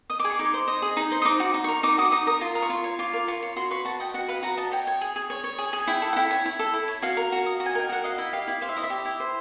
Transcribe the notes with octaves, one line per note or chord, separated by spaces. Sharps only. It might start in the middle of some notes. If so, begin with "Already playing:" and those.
D#5 D#6
D6
G#4
C#6
D#4 D6
C5
D#5
G#4
D#4
C5
D#6
D#4 D6
F#4
D#4
A#4 C#6
D#4 D6
F#4 D#6
D6
D#4 D#6
A#4 D#6
F4
A#4
C#6
F4 C6
C#5
F4 D6
A#4
F4 C#6
C#5
F#4 C6
B4 C#6
F#4 A5
D#5 G5
F#4 F#5
B4 F5
F#4 A#5
D#5 A5
C#5 G5
C#5
G#4
G#4
C#5
C#5
G#4
G#4
E4 G5
A4
F#5
E4 G5
C#5
E4
A4
E4
C#5
F#4 F5
A#4
F#4
D#5
F#4
G#5
A#4 G5
F#4 F#5
D#5 F5
E4 E5
G4 F5
E4 F5
C5 F5
E5
E4 D#5
E5
G4
E4
C5